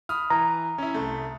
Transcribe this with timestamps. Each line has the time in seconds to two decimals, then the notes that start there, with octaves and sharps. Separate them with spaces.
0.09 B5 D#6 F6
0.30 E3 A#5
0.78 C#4 E4
0.95 C2 A3